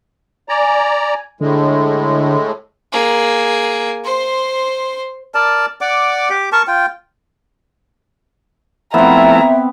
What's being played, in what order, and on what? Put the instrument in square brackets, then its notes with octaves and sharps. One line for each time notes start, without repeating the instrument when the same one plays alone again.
[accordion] D5 A#5 [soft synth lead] G#5
[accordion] A2 G#3 [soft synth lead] D3
[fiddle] A#3 G#4
C5 C6
[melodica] A#4 D5 A5
D5 F#5 D6
G4 D6
A#4 A5 C#6
F4 G5
[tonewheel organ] F3 A3 E4 [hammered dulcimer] B3 C4 [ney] E5 [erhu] A#5